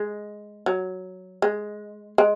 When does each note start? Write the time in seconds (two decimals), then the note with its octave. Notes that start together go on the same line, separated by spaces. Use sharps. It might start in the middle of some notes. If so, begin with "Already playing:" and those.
Already playing: G#3
0.66 F#3
1.42 G#3
2.18 G#3